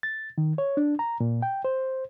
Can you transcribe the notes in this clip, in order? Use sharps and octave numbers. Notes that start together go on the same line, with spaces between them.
A6
D#3
C#5
D4
A#5
A#2
G5
C5